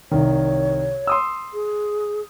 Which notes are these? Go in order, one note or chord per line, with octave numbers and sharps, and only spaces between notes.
C2 D#3 C#5
C6 D#6 E6
G#4